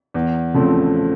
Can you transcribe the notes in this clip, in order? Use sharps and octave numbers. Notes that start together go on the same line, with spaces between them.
E2
C#3 F3 A3 C4